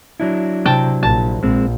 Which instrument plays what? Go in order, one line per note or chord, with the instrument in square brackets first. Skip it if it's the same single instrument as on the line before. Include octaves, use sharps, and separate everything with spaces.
[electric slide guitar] F#3 D4 E4
[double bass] C3 [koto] G5 A5
[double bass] A#1 [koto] A5
[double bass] A#1 [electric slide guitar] G#3 C4